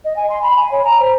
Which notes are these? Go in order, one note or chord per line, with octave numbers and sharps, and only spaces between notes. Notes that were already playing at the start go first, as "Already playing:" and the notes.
D#5
G#5
C6
B5
G#5
C#5
A#5
C5